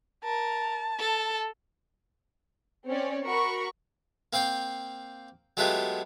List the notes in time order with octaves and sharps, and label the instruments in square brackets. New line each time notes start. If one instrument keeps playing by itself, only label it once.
[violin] A#4 [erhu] A5
[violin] A4
[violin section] C4 C#4 C#5 D5
F#4 A#4 B5 C#6
[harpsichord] A#3 C4 F5 G5
F#3 G#3 A3 B3 F4 G4